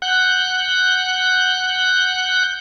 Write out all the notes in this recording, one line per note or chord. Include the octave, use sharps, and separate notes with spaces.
F#5 F#6 G6